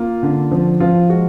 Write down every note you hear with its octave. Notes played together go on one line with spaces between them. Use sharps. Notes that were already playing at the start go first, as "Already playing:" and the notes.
Already playing: A#3 F4
D3
F3
F3 F4
G#3 F#4